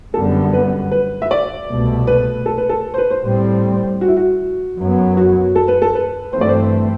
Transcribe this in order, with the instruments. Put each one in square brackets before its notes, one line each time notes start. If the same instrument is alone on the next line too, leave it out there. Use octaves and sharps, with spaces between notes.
[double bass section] F#2 D3 G3 B3 [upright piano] A4
[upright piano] B4
B4
E5
D5
[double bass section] C2 B2 A3
[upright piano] B4
A4
B4
A4
C5
B4
C5
[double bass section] A2 G3 C4
[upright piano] F#4
E4
F#4
[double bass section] F#2 F#3 B3
[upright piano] F#4
A4
B4
A4
B4
[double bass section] G2 E3 A3 C4 [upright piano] C5
[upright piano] D5
C5